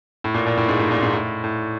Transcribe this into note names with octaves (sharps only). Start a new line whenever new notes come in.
A2
A#2
A#2
A2
G#2
A2
A#2
G#2
A2
A2